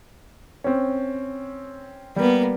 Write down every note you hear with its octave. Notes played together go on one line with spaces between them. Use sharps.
C4 C#4
G3 A#3 B3